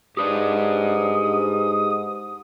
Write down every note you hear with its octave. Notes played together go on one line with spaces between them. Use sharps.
G#2 G4 B4 D5 D#6